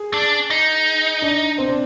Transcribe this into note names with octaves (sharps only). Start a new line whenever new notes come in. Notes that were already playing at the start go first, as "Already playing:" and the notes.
Already playing: G#4
D4
D#4
D4
C4
D4